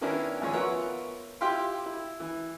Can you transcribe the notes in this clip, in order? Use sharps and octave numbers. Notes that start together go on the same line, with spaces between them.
D#3 B3 C#4 D4 E4 A#4
G#1 D#2 F3 C#5 G#5
B3 F4 A#4 C#5 E5 F#5
E4 F4 G4 F5 G5 C6
E4
E3